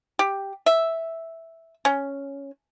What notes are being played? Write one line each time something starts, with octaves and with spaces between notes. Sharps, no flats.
G4
E5
C#4